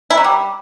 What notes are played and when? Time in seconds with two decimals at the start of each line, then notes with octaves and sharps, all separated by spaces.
0.10 E4
0.17 F#3
0.24 G3